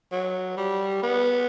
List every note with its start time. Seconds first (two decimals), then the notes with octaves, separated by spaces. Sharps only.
0.12 F#3
0.57 G3
1.02 B3